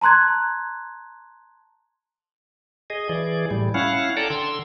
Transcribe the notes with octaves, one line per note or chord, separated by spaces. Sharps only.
A5 A#5 C6 F#6 G#6
G#4 D#5
E3 G#4 D5
A2 G3
C#4 E4 F5 F#5
A4 D5 F#5 G5 A5 A#5
D3 C6 E6